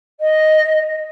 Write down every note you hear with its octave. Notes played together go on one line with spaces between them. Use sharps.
D#5